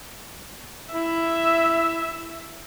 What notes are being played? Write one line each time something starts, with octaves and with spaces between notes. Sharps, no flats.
E4 E5